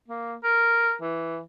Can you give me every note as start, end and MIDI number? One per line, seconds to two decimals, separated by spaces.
0.08 0.35 58
0.44 0.95 70
1.02 1.40 52